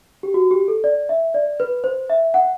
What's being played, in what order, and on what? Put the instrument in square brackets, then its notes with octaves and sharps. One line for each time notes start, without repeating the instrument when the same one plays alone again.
[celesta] G4
F#4
G4
A4
D5
E5
D5
B4
C5
E5
F#5